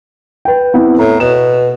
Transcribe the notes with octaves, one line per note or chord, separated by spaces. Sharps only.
B4 G5
B3 C4 E4
A2 A#5
B2 E7